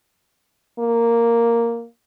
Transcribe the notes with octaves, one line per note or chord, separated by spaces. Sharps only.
A#3